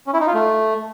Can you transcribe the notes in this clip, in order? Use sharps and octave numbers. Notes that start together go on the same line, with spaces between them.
C#4
E4
D#4
F4
A3